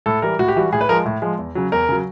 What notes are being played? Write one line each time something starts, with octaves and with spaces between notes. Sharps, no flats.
A2 A4
E3 G3 A#4
A2 F#4
G4
E3 G3 F#4
A2 G#4
B4
F3 G#3 A#4
A2
F3 G#3
E2
C#3 F#3
E2 A#4
C#3 F#3